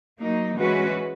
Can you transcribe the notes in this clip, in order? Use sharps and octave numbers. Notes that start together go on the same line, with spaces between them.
F#3 A#3 D#4
E3 G#3 C#4 F#4 B4